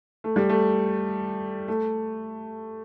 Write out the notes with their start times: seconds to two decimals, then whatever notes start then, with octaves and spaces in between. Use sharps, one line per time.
0.24 A3
0.36 G3
0.49 A3
1.68 A3